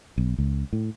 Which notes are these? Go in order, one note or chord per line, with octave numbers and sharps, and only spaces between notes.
B1
C#2
A2